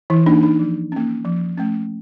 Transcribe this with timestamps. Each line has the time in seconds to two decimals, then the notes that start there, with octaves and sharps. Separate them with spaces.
0.10 E3 E4
0.26 A#3 D4 D#4
0.43 D#4
0.59 F3
0.92 A#3 C#4
1.25 F3
1.57 A3 C#4